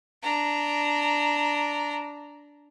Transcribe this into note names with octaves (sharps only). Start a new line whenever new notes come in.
D4 A#5